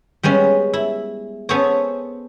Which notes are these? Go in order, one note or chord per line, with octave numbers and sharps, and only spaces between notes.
G3 G#3 B3 C#4
E4
B3 C#4 G#4 A4 C5 C#5